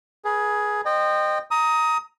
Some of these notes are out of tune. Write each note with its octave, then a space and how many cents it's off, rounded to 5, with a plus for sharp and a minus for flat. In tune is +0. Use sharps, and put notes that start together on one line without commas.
G#4 +10 B4 -35
C5 +0 D#5 -25 G5 +0
A#5 +0 D#6 +20